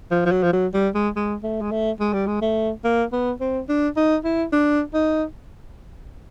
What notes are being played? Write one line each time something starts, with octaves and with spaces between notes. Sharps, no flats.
F3
F3
F#3
F3
F#3
G3
G#3
G#3
A3
G#3
A3
G#3
G3
G#3
A3
A#3
B3
C4
D4
D#4
E4
D4
D#4